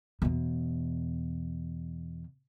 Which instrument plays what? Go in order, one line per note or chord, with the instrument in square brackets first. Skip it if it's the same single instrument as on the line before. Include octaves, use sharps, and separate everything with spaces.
[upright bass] E2 B2